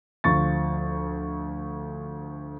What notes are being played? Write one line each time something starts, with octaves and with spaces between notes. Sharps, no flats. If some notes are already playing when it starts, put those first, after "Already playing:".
D2 F3 C#6 A6